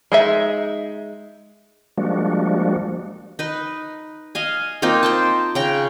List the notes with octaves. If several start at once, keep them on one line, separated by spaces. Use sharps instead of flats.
G#3 D#4 E5
F3 G3 G#3 A#3 D4 F#4
D#4 B4
D#5 F5 G#5
A#3 C4 D#4 F4
C5 G5 A5
C#3 G5 A#5